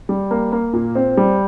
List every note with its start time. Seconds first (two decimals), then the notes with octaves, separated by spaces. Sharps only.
0.09 G3
0.31 A#3
0.52 A#3
0.73 A#2
0.95 C4
1.17 G3